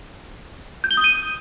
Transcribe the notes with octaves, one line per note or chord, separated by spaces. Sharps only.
G6
G7
D#6
D#7